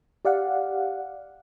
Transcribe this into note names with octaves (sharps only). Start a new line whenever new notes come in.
G4 D5 F5 F#5